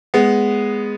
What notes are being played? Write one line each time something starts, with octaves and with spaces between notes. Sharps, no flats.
G#3 B3